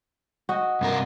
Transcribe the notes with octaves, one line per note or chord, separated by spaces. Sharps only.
F#4 D#5
G2 C3 A#4